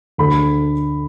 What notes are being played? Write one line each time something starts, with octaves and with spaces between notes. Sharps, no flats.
D2 D3 A3 B5